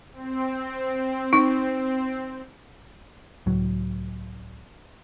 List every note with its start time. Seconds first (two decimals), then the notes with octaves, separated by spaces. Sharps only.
0.13 C4
1.33 D#4
3.46 C#2 A2 F#3